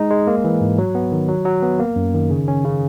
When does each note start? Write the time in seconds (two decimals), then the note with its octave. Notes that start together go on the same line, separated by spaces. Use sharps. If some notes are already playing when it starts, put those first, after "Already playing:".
Already playing: G#3 D#4
0.10 G#3
0.27 A#3
0.44 E3
0.61 G#2
0.78 F#3
0.95 B3
1.12 D#3
1.29 F#3
1.45 F#3
1.62 B3
1.79 A#3
1.96 F#2
2.14 D#3
2.30 C#3
2.48 C#4
2.65 C#3